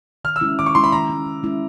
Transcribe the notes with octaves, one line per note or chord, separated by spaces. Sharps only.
D#3 F6
E6
G#3 C#4 E4
D#3 D6
C#6
G#3 C#4 E4 C6
B5
D#3 A#5
G#3 C#4 E4
D#3
G#3 C#4 E4